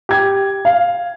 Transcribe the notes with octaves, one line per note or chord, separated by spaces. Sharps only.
G4 G#6
F5